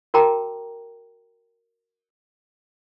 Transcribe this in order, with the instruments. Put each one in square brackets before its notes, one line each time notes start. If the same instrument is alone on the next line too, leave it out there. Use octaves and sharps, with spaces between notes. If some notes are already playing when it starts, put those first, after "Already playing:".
[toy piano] F#4 A#4 G5 A5 A#5 D6